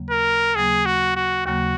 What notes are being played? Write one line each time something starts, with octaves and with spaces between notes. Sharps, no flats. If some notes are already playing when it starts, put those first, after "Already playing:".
Already playing: D#2 C#3 F#3 A#3
A#4
D#2 C#3 F#3 A#3 G#4
F#4
F#4
D#2 C#3 F#3 A#3 F#4